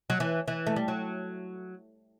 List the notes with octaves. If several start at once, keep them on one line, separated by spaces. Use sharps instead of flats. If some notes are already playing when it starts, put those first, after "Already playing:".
F#3
E3
E3
A3
G3
F#3